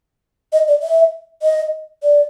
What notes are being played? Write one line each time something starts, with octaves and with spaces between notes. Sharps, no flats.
D#5
D5
E5
D#5
D5